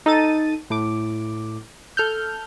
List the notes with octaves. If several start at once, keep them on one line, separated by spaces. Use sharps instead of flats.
D#4 A4 A6 D#7
A2 D6
A4 F6 G6